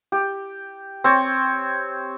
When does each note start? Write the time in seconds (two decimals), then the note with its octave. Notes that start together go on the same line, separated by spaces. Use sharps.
0.12 G4
1.04 C4 C#5